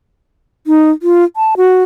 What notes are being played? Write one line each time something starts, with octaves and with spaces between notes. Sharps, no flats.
D#4
F4
A5
F#4